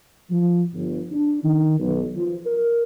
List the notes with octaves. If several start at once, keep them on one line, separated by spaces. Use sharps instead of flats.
F3
G1
D4
D#3
B1
F3
A#4